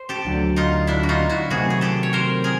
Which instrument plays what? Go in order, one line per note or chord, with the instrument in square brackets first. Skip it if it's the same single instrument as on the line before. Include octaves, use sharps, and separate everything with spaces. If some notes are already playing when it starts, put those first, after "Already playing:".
Already playing: [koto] C5
G4 A4
[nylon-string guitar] D2 D3 F#3
[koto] D#4 F4
D4 E4
F#4
D#4 F4
E4 F#4
[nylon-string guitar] C3 D#3 F#3 A3 C4 [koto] F#4 G#4
[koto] G#4
G4 A4
C#5
A#4 C5
G#4 A#4